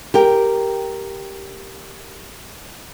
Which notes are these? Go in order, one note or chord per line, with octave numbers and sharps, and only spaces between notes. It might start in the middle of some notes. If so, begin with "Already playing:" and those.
G4 A#4 G5